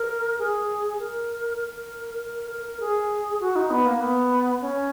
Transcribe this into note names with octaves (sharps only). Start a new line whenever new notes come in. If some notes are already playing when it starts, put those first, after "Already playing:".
Already playing: A#4
G#4
A#4
A#4
A#4
A#4
G#4
F#4
D#4
B3
A#3
B3
C#4